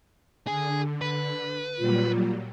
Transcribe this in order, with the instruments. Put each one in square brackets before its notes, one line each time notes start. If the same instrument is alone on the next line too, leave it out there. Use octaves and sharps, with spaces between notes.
[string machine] D3 [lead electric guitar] G#4
[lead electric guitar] B4
[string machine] A#2 F#3 G3 [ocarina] F4